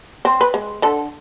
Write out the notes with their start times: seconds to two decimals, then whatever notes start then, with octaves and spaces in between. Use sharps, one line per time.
0.25 C4
0.41 B4
0.54 G#3
0.82 D3 A4